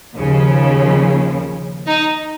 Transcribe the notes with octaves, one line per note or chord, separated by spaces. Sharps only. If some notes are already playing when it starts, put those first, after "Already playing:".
D#2 C#3 F3
D#4